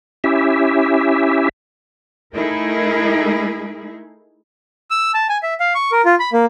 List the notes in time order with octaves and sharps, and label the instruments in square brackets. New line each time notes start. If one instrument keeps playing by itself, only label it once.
[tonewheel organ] C#4 E4 G4 E5
[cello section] A3 D#4 E4 G#4 A#4
[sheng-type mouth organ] E6
A5
G#5
E5
F5
C#6
A#4
F4
B5
A#3